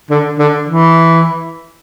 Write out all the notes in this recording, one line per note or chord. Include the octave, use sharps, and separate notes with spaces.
D3
D3
E3